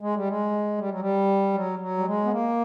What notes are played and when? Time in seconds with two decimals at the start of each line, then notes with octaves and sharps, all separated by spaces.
0.01 G#3
0.15 G3
0.28 G#3
0.78 G3
0.89 F#3
1.00 G3
1.54 F#3
1.79 F#3
1.98 G3
2.05 G#3
2.24 B3
2.31 A#3